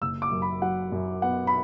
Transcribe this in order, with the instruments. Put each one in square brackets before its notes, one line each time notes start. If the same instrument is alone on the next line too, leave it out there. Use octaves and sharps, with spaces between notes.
[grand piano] F#1 E6
D6
F#2
B5
F#3 F#5
F#2
B3 F#5
B5